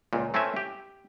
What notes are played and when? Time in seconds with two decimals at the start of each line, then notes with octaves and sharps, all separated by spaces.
0.13 C#2 A#2
0.34 A3 C4 C#4 E4 B4 E5
0.57 G4